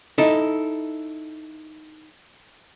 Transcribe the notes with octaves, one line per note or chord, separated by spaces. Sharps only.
D#4 E4 A4